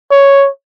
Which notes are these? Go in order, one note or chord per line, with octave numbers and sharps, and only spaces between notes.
C#5